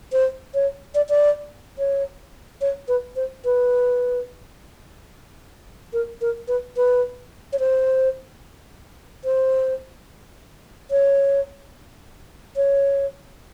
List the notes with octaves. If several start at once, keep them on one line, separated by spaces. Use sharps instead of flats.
C5
C#5
D5
D5
C#5
C#5
B4
C5
B4
A#4
A#4
B4
B4
C#5
C5
C5
C#5
C#5